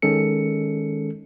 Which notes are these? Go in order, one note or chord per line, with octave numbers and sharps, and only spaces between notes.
D#3 G#3 C#4 A4 C#7